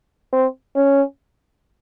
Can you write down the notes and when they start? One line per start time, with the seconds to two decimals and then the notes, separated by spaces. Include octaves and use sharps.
0.33 C4
0.76 C#4